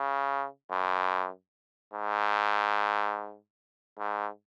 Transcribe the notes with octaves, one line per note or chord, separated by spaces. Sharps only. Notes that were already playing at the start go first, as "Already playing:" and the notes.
Already playing: C#3
F#2
G#2
G#2